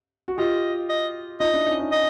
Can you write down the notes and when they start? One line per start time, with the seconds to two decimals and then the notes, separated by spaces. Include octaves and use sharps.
0.28 F#4
0.38 F4 G4 D#5
0.89 D#5
1.40 D#4 F4 D#5
1.54 D4 E4
1.66 C#4 D#4
1.79 C#4 D#4
1.92 D#5